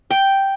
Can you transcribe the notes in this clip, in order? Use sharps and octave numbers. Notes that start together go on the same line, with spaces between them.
G5